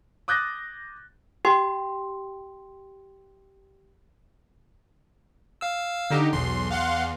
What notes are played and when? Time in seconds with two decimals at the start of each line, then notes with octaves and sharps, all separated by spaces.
0.28 D6 D#6 F#6 G6 A6 A#6
1.45 G4 G5 C6
5.61 F5 E6
6.10 D3 D#4 G4
6.33 B1 E2 C6
6.71 F5 F#5 C6